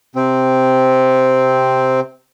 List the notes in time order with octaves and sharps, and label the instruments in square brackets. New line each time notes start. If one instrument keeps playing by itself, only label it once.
[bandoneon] C3 C4